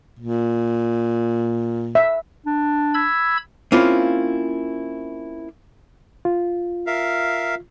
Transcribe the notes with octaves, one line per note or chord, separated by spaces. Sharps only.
A#2
E5
D4
B5 E6 G#6
A#3 C4 C#4 E4 F4
F4
A#4 E5 F5